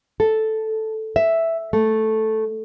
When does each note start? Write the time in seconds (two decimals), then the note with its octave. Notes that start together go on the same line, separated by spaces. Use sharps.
0.20 A4
1.16 E5
1.73 A3